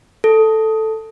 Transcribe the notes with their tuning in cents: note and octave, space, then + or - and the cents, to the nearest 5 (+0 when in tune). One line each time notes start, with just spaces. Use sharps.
A4 +0